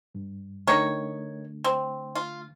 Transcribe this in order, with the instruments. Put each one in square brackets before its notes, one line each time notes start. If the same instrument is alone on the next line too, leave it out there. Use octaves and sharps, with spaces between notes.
[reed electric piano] G2
[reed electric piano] D3 A3 [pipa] D#3 A#4 C#5
[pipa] C4
F4